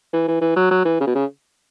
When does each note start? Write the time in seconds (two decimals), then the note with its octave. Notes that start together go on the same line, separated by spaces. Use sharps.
0.13 E3
0.28 E3
0.41 E3
0.56 F#3
0.71 F#3
0.85 E3
1.00 C#3
1.07 B2
1.15 C#3